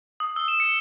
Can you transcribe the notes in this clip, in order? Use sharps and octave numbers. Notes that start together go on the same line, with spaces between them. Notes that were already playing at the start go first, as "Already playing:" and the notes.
D#6
E6
E7
C#7